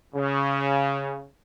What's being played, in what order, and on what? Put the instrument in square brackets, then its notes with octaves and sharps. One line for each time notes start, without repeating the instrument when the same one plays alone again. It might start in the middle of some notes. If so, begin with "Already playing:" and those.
[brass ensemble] C#3